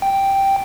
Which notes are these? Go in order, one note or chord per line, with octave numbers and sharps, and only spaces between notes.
G5